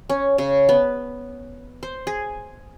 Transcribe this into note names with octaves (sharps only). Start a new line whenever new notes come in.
C#4
C#3
B3
C5
G#4